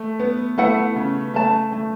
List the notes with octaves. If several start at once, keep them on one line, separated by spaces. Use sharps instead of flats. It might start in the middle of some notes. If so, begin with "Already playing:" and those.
Already playing: A3
B3
A3 E4 B4 F#5
C#3
A3 B4 A5
A3